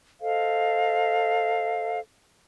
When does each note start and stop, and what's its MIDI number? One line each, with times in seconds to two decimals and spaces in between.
0.21 2.00 69
0.21 2.00 72
0.21 2.00 75
0.21 2.00 77